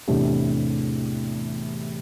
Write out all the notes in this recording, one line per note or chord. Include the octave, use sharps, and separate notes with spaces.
E2 A2 C3 D4 G4